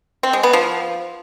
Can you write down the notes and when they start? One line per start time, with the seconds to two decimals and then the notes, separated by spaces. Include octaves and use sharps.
0.23 C4
0.33 G#3
0.43 B3
0.53 F3